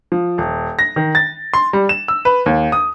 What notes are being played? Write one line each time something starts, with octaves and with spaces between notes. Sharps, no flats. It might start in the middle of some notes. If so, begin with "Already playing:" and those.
F3
D#1
A#6
D#3
A6
C6
G3
E7
E6
B4
D#2
D#6